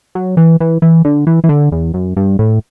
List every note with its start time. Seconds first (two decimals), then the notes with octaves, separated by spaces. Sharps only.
0.15 F#3
0.37 E3
0.60 E3
0.82 E3
1.05 D3
1.27 E3
1.44 E3
1.49 D3
1.72 E2
1.94 F#2
2.17 G2
2.39 A2